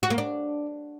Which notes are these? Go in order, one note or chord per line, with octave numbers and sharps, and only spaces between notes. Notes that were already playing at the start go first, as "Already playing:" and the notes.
F#4
A#3
D4